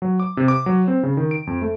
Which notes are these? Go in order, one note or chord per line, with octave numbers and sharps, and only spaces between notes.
F#3
D6
C3
D6
F#3
C4
C#3
D#3
D7
F2
A3